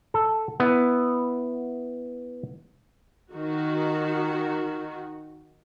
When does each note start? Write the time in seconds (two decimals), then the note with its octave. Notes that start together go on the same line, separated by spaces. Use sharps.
0.14 A4
0.60 B3 E4
3.32 D#3 F#4